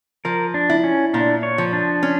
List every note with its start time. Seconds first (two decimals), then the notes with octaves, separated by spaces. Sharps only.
0.25 F3 A#4
0.54 D4
0.70 E4
0.84 C#4
1.14 A#2 D4
1.43 C#5
1.58 F3
1.73 D4
2.03 C#4